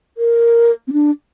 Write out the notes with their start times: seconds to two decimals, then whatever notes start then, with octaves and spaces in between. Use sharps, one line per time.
0.18 A#4
0.87 C4
0.93 D4